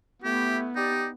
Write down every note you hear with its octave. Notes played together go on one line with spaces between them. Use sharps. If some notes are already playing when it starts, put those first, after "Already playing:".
A3 B3 E4 G4
D#4 G4 D5